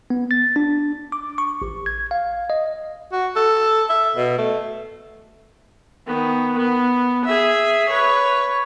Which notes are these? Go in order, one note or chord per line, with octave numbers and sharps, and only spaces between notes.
B3
A6
D4
D6
C#6
A1
G#6
F5
D#5
F#4
A4
E5
B2
A3
D#3 B3
B3
G#4 E5
B4 C#5